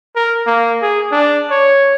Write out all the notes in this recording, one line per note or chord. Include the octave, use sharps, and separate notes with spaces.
A#4
A#3
G#4
D4
C#5